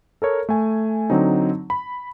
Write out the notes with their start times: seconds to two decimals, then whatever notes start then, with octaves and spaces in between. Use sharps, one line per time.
0.22 A4 A#4 C#5
0.49 A3 G#5
1.10 D3 F#3 C4 D#4
1.70 B5